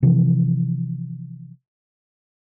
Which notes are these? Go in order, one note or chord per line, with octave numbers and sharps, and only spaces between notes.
C3 E3 F3